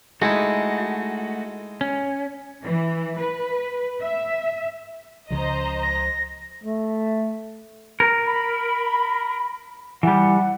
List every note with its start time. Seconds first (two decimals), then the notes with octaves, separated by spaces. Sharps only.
0.22 G#3 A3 D#4 E4 F#4
1.81 C#4
2.64 E3
3.17 B4
4.02 E5
5.30 C#2 C#3 F3 C5 D#5 A#5
5.83 A#6
6.64 A3
8.00 A#4
8.25 B5
10.03 E3 G3 F#5